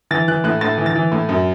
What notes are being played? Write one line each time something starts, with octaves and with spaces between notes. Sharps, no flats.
E3 A6
E3 F#6
A2 F#6
A2 A6
E3
A6
E3
A2
F#2